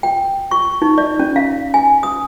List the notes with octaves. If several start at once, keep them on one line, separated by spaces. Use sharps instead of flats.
G5
C#6
D#4
D5
C#4
F5
G#5
D#6